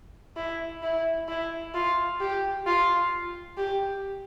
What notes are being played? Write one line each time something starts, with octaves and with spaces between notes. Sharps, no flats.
E4
E4
E4
F4
G4
F4
G4